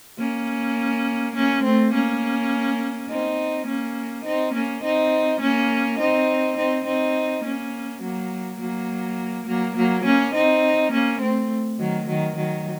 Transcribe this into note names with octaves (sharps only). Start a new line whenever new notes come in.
A#3 C#4
A#3 C#4
A3 C4
A#3 C#4
C4 D#4
A#3 C#4
C4 D#4
A#3 C#4
C4 D#4
A#3 C#4
C4 D#4
C4 D#4
C4 D#4
A#3 C#4
F#3 A#3
F#3 A#3
F#3 A#3
F#3 A#3
A#3 C#4
C4 D#4
A#3 C#4
A3 C4
D#3 F#3
D#3 F#3
D#3 F#3